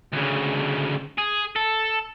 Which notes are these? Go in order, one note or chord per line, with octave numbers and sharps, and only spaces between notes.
D2 C#3
G#4
A4